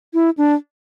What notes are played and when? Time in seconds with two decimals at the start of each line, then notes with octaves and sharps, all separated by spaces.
0.14 E4
0.38 D4